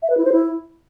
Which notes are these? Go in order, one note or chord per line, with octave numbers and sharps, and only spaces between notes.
E5
B4
E4
C5
E4